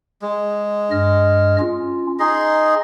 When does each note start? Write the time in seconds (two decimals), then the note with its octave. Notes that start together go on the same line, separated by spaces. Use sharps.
0.22 G#3
0.91 G2 D#5 F6
1.59 C#4 F4
2.20 D#4 G#4 D#5 C6